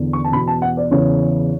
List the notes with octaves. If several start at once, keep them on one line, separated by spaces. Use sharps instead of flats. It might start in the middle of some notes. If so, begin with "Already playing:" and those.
Already playing: E2 D3
C#6
A5
E2 B2 B5
A5
F#5
D5
E2 C#3 E3 C#5